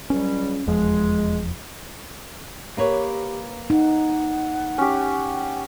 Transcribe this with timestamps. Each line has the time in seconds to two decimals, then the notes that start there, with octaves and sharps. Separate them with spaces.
0.10 C#2 F#3 G3 C#4
0.66 F1 E2 F3 G#3
2.77 A#3 G4 B4 C#5
3.70 D#4 F#5
4.78 C#4 G4